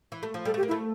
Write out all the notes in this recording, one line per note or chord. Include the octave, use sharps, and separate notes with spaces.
E3
A3
F3
G3 A4
A3
G4
A#3
E4
A3